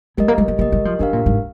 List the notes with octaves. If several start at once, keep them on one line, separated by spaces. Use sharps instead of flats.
G#3 G4 A#4 D#5
A#3
G#3
A#3
A#3 G4 A#4 D#5
G#3
F3
D#3 D4 G4 A#4 F5
A#2
G#2